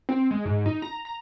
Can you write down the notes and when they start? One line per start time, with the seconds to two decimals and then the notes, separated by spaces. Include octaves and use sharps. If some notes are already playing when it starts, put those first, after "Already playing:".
0.09 C4
0.31 G#3
0.45 G#2
0.66 D#4
0.82 A#5
1.05 A#5